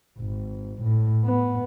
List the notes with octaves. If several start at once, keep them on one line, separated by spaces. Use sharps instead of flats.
G#1
A2
B3